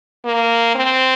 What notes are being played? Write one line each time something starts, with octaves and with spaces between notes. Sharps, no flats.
A#3
C4